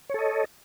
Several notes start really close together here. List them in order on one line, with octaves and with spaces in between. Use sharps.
C#5 A4 D#5